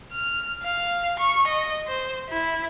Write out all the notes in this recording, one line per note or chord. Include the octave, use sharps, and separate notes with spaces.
F6
F5
C#6
D#5
C5
E4